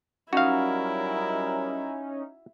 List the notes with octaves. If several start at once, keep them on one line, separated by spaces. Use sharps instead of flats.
F#3 G3 C#4 D#4 E4 F#4 A#4 F5